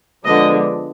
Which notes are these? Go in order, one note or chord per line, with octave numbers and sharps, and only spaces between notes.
D3 F3 G#3 B3 D4 D#5